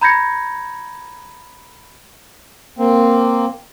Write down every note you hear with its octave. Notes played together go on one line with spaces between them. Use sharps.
A#5 B5 G6 G#6 A#6 C#7
A#3 C4